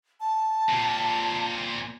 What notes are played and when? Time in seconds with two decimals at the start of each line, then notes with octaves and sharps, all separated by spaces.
0.20 A5
0.69 A#2 C4